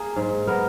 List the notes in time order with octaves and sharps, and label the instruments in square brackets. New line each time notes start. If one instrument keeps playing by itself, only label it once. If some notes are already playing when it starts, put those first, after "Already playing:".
Already playing: [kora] A#3 G#4
G#2
B3 A#4